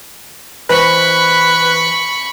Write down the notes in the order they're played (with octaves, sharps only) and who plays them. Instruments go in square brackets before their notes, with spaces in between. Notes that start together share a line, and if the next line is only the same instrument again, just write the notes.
[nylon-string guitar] E3 C5 D#5 [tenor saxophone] B4 [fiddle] B5 C#6